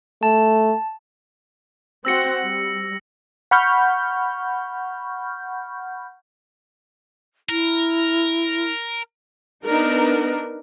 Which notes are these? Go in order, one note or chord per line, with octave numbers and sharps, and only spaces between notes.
A3 A5
C4 F#4 F#5 E6 A#6 C#7
G3
F#5 B5 C#6 F6 G6
E4 A#4
B3 D4 D#4 A#4